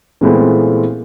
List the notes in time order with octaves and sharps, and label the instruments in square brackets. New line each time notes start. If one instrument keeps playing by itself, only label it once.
[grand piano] A#2 E3 G#3 A3 B3 C4